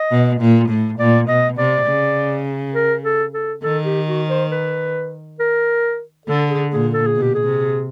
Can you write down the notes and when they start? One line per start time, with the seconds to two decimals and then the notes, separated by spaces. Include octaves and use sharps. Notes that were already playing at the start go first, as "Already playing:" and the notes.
Already playing: D#5
0.11 B2
0.40 A#2
0.69 A2
0.99 A#2 D5
1.27 B2 D#5
1.57 C3 D5
1.87 C#3
2.75 A#4
3.04 A4
3.34 A4
3.63 D#3 A4
3.85 G4
4.07 F#4
4.30 C5
4.52 B4
5.40 A#4
6.27 D3 A4
6.50 G#4
6.71 A#2 G#4
6.93 A4
7.07 G#4
7.16 B2
7.21 G4
7.34 G#4
7.45 C3